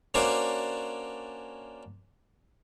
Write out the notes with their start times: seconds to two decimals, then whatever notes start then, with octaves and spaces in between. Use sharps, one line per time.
0.14 A#3 C#4 D4 F#4 C5 D5